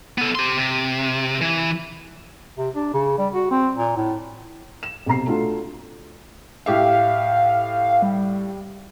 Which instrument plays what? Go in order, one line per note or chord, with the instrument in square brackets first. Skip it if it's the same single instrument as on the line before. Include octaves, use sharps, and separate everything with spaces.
[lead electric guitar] B3 A4
G4 C6
C3
E3
[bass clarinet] C3
D4
C#3
G3
F#4
C4
A#2
A2
[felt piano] E7
B1 C3 A#5 C7
A3 D4 F4 F#4 A4
[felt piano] A2 G4 E5 [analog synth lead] F5
[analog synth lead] G3